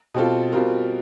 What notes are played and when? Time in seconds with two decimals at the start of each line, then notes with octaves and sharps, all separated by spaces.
0.14 B2 G3 C4 F4 A4
0.52 B2 G3 C4 F4 A#4